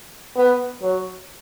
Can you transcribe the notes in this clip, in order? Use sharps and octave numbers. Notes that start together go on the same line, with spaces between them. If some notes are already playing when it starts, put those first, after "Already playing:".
B3
F#3